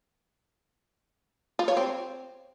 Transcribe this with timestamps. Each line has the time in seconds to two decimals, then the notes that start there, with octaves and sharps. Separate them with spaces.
1.59 F4
1.68 C#5
1.77 C4